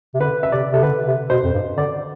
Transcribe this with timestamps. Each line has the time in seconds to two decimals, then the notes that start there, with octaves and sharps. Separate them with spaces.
0.14 C3
0.20 D3 B4
0.43 E5
0.52 C3 D5
0.72 C3 A4
0.83 D3 B4
1.07 C3
1.30 B2 C5
1.44 F2
1.53 G2
1.77 D3 D5